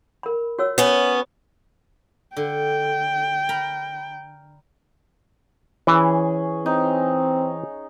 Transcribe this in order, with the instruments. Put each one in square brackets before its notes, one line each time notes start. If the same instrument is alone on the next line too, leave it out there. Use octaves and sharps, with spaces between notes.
[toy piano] A#4 B5
F#4 C#5 E6
[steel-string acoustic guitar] B3 C#4 [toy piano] B4 C#5
[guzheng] D3 [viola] G5
[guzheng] A#4 A#5 B5
[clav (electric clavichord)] E3 [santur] C#4 G#4
[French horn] C4 [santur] D#4